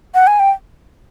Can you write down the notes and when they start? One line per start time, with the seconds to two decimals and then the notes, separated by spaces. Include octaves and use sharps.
0.15 F#5
0.27 G#5
0.40 G5